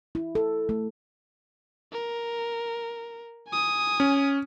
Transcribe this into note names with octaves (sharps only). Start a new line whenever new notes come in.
E4
A4
A3
A#4
G#5 D#6
C#4